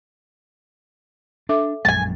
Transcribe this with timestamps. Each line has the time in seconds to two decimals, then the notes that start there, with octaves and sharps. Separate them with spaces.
1.49 D4 A4 E5 D6
1.85 A#1 F#2 G#3 G#5 A5